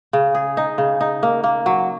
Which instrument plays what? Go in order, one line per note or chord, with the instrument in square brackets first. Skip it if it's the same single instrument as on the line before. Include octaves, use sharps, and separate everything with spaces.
[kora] C#3
G#4
D#4
C#3
D#4
A#3
A#3
F#3